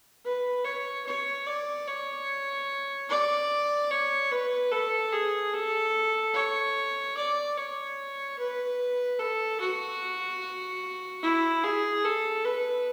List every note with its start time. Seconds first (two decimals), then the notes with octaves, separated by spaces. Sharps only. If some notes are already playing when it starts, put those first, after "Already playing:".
0.25 B4
0.65 C#5
1.06 C#5
1.47 D5
1.87 C#5
3.09 D5
3.91 C#5
4.32 B4
4.71 A4
5.13 G#4
5.54 A4
6.34 C#5
7.17 D5
7.57 C#5
8.38 B4
9.19 A4
9.60 F#4
11.23 E4
11.64 G#4
12.05 A4
12.45 B4